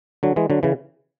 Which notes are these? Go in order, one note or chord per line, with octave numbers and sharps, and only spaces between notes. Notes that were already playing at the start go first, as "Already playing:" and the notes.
D3 F#3
E3 G#3
D3 F#3
C#3 E3